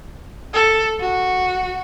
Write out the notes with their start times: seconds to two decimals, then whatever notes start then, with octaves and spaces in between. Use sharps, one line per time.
0.54 A4
1.00 F#4